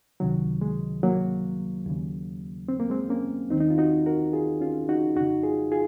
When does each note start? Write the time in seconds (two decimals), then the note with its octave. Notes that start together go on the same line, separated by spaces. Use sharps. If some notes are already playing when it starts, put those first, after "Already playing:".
0.20 C#2 C3 D#3 F#3
0.61 G#3
1.03 F#3 A#3
1.86 D#2 C#3
2.68 C4
2.79 A#3
2.90 G#3 C4
3.09 A#3 C#4
3.50 D#2 D#3 C4 D#4
3.60 D#4
3.70 F4
3.78 D#4 F#4
4.06 F#4 A#4
4.33 F4 G#4
4.61 C#4 F4
4.89 D#4 F#4
5.16 F2 C#3 D#4 F#4
5.43 F4 G#4
5.72 F4 G#4